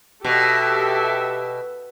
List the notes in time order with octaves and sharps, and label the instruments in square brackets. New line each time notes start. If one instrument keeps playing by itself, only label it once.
[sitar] B2 [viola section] G4 A4 E5